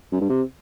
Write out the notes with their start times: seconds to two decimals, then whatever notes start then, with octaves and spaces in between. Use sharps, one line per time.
0.12 F#2
0.21 G2
0.30 C3